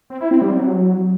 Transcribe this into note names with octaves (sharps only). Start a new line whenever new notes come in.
C4
E4
C4
G3
F#3